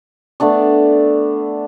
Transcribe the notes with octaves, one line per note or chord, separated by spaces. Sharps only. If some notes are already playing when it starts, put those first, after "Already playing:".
A3 B3 D4 D5